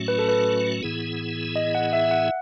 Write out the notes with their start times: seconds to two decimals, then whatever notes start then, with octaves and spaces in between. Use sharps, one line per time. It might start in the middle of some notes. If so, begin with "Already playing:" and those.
Already playing: A2 F#3 A3 C#4 F#4
0.08 B4
0.19 A4
0.29 B4
0.83 A2 E3 B3 E4 G#4
1.56 D#5
1.75 F#5
1.93 E5
2.11 F#5